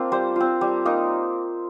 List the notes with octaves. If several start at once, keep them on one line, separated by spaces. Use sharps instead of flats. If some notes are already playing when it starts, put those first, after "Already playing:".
Already playing: A#3 C4 D4 F4
G3 C5
C4 F4
G3
A#3 D#4